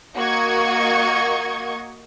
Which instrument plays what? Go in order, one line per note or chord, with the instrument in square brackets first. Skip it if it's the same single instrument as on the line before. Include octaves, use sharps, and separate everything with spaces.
[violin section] A#3 F#4 D#5 C#6 G#6